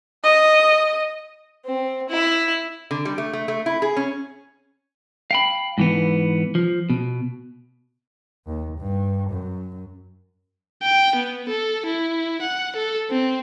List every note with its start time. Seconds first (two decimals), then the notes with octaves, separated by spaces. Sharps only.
0.24 D#5
1.66 C4
2.09 E4
2.91 D3
3.05 G3
3.18 A3
3.33 A3
3.48 A3
3.66 E4
3.82 G#4
3.97 C#4
5.31 F5 G5 B5
5.78 G#2 E3 B3
6.55 F3
6.90 B2
8.47 D#2
8.79 G2
9.31 F#2
10.83 G5
11.16 B3
11.49 A4
11.86 E4
12.42 F#5
12.76 A4
13.10 C4